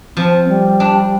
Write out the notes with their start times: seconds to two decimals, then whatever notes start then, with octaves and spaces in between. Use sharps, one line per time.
0.16 F3 C4
0.48 G3
0.80 D4